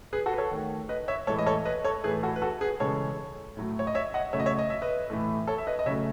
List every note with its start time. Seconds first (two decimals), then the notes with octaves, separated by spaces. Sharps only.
0.13 G#4 B4
0.26 F#4 A4
0.33 B4
0.38 A4 C#5
0.51 D#3 A3
0.89 B4 D#5
1.08 C#5 E5
1.27 A2 E3 G#3 A4 C#5
1.39 D#5
1.46 A4 C#5
1.65 B4 D#5
1.85 A4 C#5
2.03 A2 E3 A3 G#4 B4
2.23 F#4 A4
2.36 B4
2.42 F#4 A4
2.61 G#4 B4
2.80 C#3 E3 G#3 A4 C#5
3.57 A2 F#3 A3
3.79 C#5
3.87 D#5
3.95 C#5 E5
4.14 D#5 F#5
4.33 C#3 F#3 A3 C#5 E5
4.40 D#5
4.46 C#5 E5
4.59 D#5
4.70 E5
4.82 B4 D#5
5.10 A2 E3 A3
5.47 A4 C#5
5.58 E5
5.67 B4 D#5
5.79 D#5
5.86 C#3 F#3 A3 C#5 E5